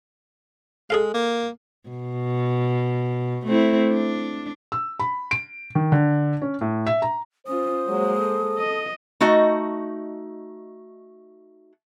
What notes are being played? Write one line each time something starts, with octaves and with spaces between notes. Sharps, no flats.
G#3 G#4 A4 F5
A#3
B2
A3 C4 E4
D4
E6
B5
D7
D#3
D3
C#4
A2
E5
A#5
C#4 F4 C5 D#6
F#3 G#3 A#3
A4
D#5
A3 D#4 F#4 D#5